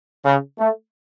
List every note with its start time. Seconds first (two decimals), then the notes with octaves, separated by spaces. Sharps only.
0.24 C#3
0.58 A3